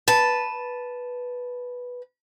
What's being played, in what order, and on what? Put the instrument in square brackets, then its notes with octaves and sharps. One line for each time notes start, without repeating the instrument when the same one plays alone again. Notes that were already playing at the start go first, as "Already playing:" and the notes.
[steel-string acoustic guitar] B4 A5